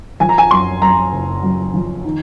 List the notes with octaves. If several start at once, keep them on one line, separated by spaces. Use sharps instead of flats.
F3 G#5
A#5
G#5
F#2 C6
F#2 A#5
F#1
F#2
F3
D#3